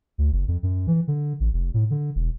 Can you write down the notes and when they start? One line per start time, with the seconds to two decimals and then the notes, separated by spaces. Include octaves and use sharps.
0.18 D2
0.32 F#1
0.48 F2
0.63 F#2
0.87 E3
1.08 D3
1.40 A1
1.53 F1
1.74 A2
1.90 D3
2.15 E1